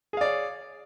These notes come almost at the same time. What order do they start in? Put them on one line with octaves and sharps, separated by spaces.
G#4 F5 D5 C#5